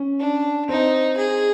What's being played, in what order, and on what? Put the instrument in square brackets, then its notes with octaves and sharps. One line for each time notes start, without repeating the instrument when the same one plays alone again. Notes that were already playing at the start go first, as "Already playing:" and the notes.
Already playing: [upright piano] C#4
[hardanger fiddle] D4
[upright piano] C4 [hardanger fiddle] D#4
[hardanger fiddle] G#4